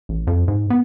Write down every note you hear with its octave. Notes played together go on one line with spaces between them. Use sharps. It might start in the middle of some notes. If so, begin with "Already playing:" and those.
A1
F2
G#2
B3